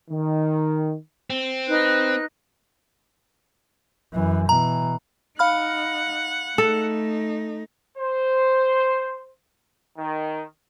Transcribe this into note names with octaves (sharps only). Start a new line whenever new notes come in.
D#3
C4
D#4 B4 F#6
F#2 E3
B2 E3 A#5
D#4 F5 F#5 B5 F6
A3 D#4 A4
C5
D#3